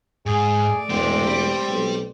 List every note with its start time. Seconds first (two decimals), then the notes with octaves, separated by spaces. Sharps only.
0.26 G#2 G#4
0.58 A3 D5
0.90 E1 G#2 G#3 C4
1.23 G4 B5
1.70 B1